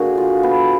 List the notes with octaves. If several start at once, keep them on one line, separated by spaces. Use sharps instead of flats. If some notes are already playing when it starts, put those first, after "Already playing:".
Already playing: D3 A#3 F#4 G#4
F4
B3